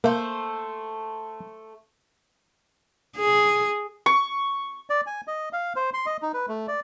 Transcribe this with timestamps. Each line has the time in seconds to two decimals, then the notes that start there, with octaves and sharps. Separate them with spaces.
0.04 A3 A#3 C5
3.17 G#4
4.06 C#6
4.90 D5
5.07 G#5
5.27 D#5
5.53 F5
5.76 C5
5.93 C6
6.06 D#5
6.22 D#4
6.34 B4
6.48 A3
6.68 D5